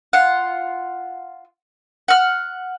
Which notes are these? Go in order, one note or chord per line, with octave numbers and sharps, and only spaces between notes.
F4 F#5
F#5 F6